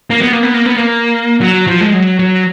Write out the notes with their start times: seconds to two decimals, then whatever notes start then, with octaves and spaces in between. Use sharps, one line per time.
0.10 A#3
0.21 B3
0.33 A#3
0.43 B3
0.54 A#3
0.66 B3
0.77 A#3
1.41 F#3
1.67 F3
1.81 G#3
1.94 F#3
2.19 F#3